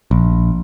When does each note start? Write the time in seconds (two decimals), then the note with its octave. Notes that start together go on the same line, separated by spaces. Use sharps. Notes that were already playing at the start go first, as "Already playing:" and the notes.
0.11 A#1